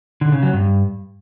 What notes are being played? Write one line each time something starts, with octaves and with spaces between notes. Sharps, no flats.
D3
C#3
F#3
G2